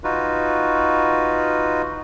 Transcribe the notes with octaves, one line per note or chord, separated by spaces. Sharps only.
D#4 F4 F#4 B4